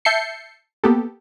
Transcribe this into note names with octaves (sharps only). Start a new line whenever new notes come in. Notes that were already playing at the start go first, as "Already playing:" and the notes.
E5 A5 G6 C7 C#7
A#3 B3 G4 A4